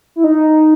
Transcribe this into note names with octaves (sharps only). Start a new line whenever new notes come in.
E4
D#4